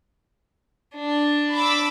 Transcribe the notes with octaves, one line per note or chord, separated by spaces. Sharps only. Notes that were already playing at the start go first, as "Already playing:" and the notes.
D4
B5 D6 E6